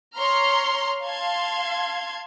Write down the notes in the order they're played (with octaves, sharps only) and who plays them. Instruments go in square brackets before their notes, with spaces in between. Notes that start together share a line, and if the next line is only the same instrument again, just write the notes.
[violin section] C#5 A#5 C6 F6
F5 A5 C6 G#6